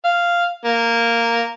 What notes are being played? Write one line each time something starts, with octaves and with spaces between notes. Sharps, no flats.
F5
A#3